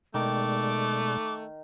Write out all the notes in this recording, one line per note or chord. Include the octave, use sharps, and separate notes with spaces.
B2 D#3 G#3 A3 D5 D6